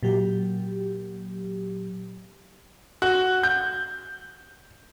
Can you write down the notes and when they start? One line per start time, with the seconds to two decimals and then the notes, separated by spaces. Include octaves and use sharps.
0.03 A#2 F#3 G4
3.02 F#4
3.43 G6